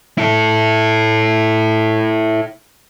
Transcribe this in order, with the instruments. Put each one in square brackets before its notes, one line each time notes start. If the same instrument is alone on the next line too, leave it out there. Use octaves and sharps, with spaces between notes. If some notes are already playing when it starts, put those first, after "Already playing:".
[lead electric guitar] E4 A4